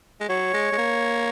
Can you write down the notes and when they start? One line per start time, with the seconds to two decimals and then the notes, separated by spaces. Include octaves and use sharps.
0.21 G#3
0.29 F#3 C#5
0.54 G#3
0.72 G#3
0.78 A#3